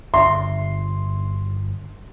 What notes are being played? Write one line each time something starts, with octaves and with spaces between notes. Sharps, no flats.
G1 D3 D4 E5 C6